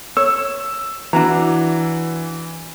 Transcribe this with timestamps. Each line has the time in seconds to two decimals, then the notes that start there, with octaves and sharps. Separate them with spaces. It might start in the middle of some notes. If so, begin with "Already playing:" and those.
0.17 C#5 E6
1.13 E3 D4 F#4 A#5